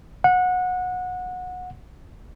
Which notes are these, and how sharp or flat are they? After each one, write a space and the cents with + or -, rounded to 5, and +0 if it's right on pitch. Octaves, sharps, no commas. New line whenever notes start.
F#5 -25